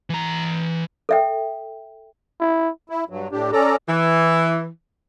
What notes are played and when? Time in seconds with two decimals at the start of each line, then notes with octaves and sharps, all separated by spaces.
0.10 E3 A#5
1.09 A4 E5 G5
2.40 E4
2.90 E4
3.10 G2 F#3
3.32 A2 D4 G4
3.52 C#4 A4 D5 A#5
3.88 E3